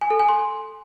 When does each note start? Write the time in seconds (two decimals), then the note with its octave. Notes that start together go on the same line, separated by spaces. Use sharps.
0.01 G#5
0.10 A4
0.19 G#5
0.29 C6